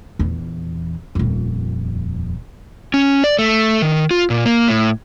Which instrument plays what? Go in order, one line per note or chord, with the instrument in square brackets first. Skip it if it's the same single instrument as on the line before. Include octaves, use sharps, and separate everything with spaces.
[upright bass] A#1 E2
D#1 F2
[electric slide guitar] C#4
D5
A3
D#3
F4
A#2
A#3
A2